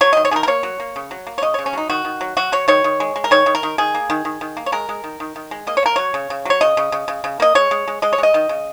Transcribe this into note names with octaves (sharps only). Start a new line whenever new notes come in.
F#3 C#5
D#3 D#5
C#5
D#3 G#4 A#4
A#4
A#3 C#5
F#3
A#3
C#3
F#3
A#3
C#5
C#3 D#5
C#3 C#5
C#4
F#3 D#4
D#3 F#4
D#3
F#3
F#3 F#4
F#3 C#5
D#3 C#5
D#3
G#3
G#3
A#4
D#3 C#5
D#3
A#4
D#3
D#3 G#4
A#3
D#3
D#3
D#3
A#3
C#5
G#3 A#4
G#3
D#3
D#3
D#3
G#3
A#3 D#5
C#5
A#3 A#4
F#3 C#5
C#3
C#3
F#3 C#5
C#3 D#5
C#3
C#3
C#3
C#3
A#3 D#5
G#3 C#5
G#3
G#3
G#3 D#5
C#5
G#3 D#5
D#3
C#3